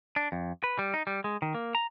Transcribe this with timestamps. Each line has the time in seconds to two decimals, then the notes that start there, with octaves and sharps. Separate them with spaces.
0.16 D4
0.32 F2
0.64 B4
0.79 G3
0.94 D#4
1.07 G3
1.24 G#3
1.42 D#3
1.54 A#3
1.75 A#5